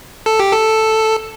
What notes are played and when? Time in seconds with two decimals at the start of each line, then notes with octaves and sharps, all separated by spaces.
0.26 A4
0.40 G4
0.52 A4